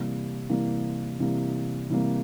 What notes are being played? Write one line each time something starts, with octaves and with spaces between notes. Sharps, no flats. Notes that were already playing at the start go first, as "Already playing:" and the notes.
Already playing: C3 E3 G3 A#3
C3 E3 G3 A#3
C3 E3 G3 A#3
C3 E3 G3 A#3